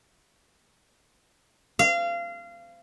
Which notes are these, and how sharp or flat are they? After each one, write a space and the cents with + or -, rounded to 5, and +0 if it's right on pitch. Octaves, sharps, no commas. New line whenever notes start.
F5 -25